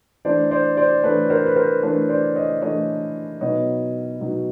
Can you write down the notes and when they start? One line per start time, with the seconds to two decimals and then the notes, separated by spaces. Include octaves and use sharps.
0.25 E3 A3 D4 C5 D5
0.51 C5 D5
0.77 C5 D5
1.04 E3 A3 D4 B4 C#5
1.30 A#4 C5
1.46 B4
1.56 A#4 C5
1.83 E3 A3 D4 B4 C#5
2.09 C5 D5
2.36 C#5 D#5
2.62 E3 A3 D4 C#5 D#5
3.41 B2 F#3 B3 D#4 C#5 D#5
4.21 B2 F#3 B3 D#4